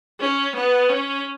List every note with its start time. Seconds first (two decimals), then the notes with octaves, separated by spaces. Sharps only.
0.20 C#4
0.55 B3
0.89 C#4